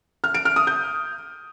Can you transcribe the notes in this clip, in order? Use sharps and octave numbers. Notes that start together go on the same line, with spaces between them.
F6
D7
F6
D#6
G6